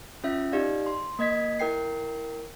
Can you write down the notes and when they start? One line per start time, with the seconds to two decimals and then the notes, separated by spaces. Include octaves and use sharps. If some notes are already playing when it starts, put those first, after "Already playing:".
0.24 C#4 F4 E5
0.52 D#4 G4 D5 F5
0.86 C6
1.19 A#3 D#5 G#6 B6
1.59 E4 A#4 G5 C7